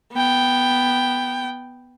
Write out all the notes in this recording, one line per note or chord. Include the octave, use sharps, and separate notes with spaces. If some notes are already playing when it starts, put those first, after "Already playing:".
B3 G5